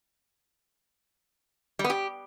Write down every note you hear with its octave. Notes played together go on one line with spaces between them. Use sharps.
G3
B3
G4